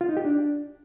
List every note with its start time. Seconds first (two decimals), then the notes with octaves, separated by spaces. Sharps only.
0.01 F4
0.09 D#4
0.17 G4
0.25 D4